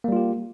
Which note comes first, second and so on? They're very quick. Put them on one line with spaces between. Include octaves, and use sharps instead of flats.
A#3 G3 F4 G4